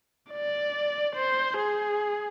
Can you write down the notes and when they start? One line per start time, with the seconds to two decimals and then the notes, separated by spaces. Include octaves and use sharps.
0.31 D5
1.16 C5
1.58 G#4